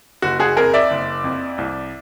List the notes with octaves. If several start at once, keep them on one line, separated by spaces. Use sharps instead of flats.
F#1 F#4
F#4 G#4
F2 G#4 A#4
D5 E5
F#1
F2
C2